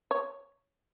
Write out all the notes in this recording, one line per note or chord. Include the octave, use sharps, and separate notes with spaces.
C#5